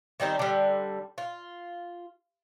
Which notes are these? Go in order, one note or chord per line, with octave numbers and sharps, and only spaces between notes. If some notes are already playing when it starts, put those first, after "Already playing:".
D#3 G3 C4 D#4
D3 G3
F4